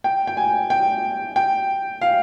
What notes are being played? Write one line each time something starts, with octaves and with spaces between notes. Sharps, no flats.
G5
G5
G#5
G5
G5
F5